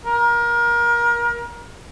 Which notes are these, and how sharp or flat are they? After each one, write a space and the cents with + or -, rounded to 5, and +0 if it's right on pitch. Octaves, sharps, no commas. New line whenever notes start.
A#4 +25